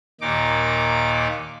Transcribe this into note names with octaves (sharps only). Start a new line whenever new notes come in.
D#2 A#2 D#4 D6